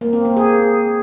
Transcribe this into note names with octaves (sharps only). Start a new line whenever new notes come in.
A#3
C4
C4
G#4